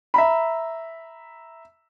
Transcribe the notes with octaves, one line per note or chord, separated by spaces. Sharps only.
E5 A#5 B5